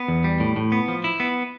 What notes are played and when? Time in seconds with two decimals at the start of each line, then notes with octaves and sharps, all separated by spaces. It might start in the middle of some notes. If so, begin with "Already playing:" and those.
Already playing: B3
0.08 E2
0.24 G3
0.40 A2
0.56 A2
0.72 B3
0.88 F3
1.04 E4
1.20 B3